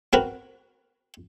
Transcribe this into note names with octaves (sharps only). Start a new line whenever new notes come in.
C4 F#4 A#4 B4